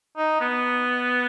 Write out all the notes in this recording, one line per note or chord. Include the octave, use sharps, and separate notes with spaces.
D#4
B3